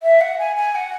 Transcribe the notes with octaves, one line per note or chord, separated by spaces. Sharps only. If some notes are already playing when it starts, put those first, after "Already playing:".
E5
F#5
G#5
G#5
F#5